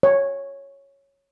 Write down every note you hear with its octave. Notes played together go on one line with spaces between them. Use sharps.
C#5